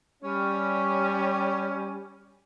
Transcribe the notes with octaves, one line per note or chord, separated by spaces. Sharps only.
G3 C#4